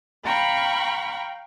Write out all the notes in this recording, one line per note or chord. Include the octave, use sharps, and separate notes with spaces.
F5 G5 A#5 B5 C#6